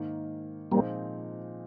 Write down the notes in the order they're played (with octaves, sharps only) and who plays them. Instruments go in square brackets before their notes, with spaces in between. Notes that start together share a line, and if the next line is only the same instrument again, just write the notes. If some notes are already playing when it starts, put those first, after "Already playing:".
Already playing: [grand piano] G#2 D#3 A#3
[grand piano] A#2 F3 G#3 C4 D#4 [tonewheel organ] G3 A#3